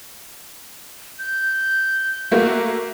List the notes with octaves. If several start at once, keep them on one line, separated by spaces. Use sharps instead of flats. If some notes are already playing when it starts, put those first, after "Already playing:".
G6
A3 A#3 F#4